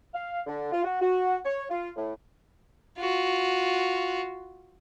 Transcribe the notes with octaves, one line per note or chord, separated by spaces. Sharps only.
F5
D3
F4
F#4
F#4
C#5
F4
A2
F4 F#4